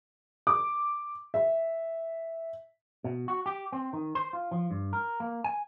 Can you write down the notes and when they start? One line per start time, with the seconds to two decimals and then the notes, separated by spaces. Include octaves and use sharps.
0.47 D6
1.34 E5
3.04 B2
3.28 F#4
3.46 G4
3.72 C4
3.93 D#3
4.15 C5
4.33 F4
4.51 F3
4.71 G2
4.93 A#4
5.20 A#3
5.44 G#5